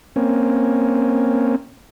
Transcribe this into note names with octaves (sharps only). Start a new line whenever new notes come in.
A#3 C4 C#4